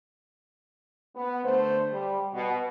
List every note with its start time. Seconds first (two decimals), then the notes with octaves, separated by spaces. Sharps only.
1.15 B3
1.43 D3 A3 C5
1.91 G3
2.33 B2